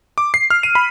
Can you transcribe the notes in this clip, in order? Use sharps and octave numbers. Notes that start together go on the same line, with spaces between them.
D6
C7
F6
D#7
B5